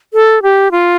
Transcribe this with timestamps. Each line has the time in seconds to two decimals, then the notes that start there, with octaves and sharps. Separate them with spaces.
0.14 A4
0.42 G4
0.71 F4